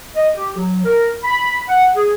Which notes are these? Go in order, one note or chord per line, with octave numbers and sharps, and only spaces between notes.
D#5
G4
F#3
A#4
B5
F#5
G#4